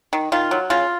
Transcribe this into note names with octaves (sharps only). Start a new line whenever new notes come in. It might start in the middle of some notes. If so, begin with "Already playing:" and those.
D#3
D#3 F4
F#3
C#3 F4